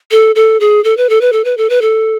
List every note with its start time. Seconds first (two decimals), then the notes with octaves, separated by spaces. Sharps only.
0.11 A4
0.35 A4
0.60 G#4
0.84 A4
0.97 B4
1.09 A4
1.21 B4
1.33 A4
1.45 B4
1.57 A4
1.70 B4
1.82 A4